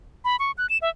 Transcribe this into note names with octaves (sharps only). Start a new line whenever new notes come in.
B5
C#6
F#6
E7
E5